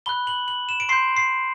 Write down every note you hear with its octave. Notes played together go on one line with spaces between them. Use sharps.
B5 F#6 G7
F#7
F#7
E7
D7
C6 G6 C7
C7